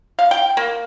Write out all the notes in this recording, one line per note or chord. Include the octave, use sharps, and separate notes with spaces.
F5
G5
A#3